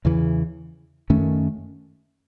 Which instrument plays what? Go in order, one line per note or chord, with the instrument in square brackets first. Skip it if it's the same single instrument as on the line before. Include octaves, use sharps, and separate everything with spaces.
[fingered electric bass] E2 C#3 E3
F#2 D#3 A3 C#4